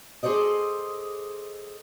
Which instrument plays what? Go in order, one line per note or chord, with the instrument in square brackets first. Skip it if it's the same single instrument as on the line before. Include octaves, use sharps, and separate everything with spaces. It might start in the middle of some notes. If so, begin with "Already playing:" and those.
[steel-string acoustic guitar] G#4 A4 C5 D5 D#5